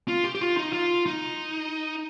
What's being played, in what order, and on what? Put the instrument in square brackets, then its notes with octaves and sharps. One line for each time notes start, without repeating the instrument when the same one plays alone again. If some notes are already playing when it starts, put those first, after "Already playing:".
[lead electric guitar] F4
G4
G4
F4
D#4
F4
D#4